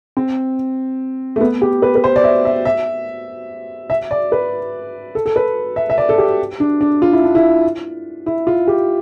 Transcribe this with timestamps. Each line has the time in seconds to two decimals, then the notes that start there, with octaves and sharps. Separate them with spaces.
0.17 C4
1.36 A3
1.41 B3
1.62 G4
1.82 B4
1.95 B4
2.04 C5
2.16 D5
2.24 E5
2.45 E5
2.65 E5
3.90 E5
4.11 D5
4.32 B4
5.15 A4
5.26 A4
5.36 B4
5.76 E5
5.90 E5
5.98 D5
6.09 A4
6.18 G4
6.60 D4
6.81 D4
7.02 F4
7.13 E4
7.24 D4
7.35 E4
8.26 E4
8.47 F4
8.68 G4